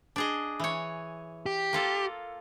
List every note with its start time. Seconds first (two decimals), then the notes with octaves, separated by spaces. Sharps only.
0.16 D4 G#4 D#5
0.60 E3 C#5
1.46 G4
1.73 A#3 F4 A4